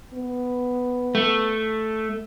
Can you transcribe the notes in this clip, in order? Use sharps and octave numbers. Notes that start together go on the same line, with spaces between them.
B3
A3